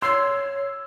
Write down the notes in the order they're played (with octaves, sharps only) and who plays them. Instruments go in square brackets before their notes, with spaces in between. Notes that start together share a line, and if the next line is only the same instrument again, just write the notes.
[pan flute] C#5 [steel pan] C6 [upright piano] E6